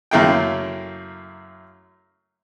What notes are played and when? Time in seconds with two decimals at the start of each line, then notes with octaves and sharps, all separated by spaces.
0.11 F#2 C#3 A3 A#3 E4 G5